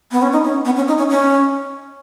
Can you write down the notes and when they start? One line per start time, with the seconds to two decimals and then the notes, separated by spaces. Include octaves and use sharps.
0.11 B3
0.22 C#4
0.33 D#4
0.44 C#4
0.65 B3
0.76 C#4
0.88 D#4
0.98 C#4
1.10 C#4